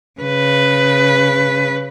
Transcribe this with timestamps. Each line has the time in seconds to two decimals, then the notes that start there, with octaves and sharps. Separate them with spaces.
0.21 C#3 B4